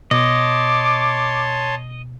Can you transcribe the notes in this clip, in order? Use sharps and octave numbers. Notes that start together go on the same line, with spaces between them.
B2 C#5 D#5 A5 C6 D6